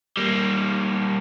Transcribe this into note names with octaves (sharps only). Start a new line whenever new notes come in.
G3 A#3